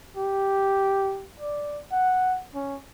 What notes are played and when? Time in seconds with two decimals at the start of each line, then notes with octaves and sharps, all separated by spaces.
0.17 G4
1.40 D5
1.92 F#5
2.55 C#4